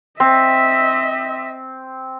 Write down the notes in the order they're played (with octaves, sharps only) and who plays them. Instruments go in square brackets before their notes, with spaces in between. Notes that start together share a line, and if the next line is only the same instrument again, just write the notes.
[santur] C4 [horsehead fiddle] D#5 E5